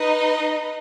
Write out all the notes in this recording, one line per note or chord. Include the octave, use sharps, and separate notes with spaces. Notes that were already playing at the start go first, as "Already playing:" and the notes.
Already playing: D#4 B4 D#5